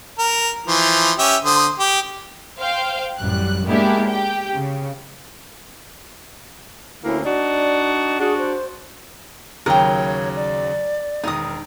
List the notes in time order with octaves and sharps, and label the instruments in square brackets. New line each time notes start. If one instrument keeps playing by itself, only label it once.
[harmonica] A#4
E3 F3
C#4 G4 E5
D3 C5 D#6
G4
[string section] C5 F5 G5
A1 F#2 G3 F#6
G#3 A#3 B3 D4 E4 G4
G4 G5
C#3
[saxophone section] D2 A#3 C#4 [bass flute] E4
[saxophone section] D4 D#4 F#4 [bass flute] D5
[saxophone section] D4 F#4 [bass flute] G#4
[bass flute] C5
[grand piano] D#2 C#3 F#3 [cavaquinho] A#4 G5 [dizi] C#5
[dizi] D5
[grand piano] E1 D#3 [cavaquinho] D#4 D#6